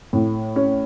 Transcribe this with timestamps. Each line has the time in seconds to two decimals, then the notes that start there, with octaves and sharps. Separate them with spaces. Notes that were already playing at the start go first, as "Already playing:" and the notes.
0.13 A2
0.56 C#4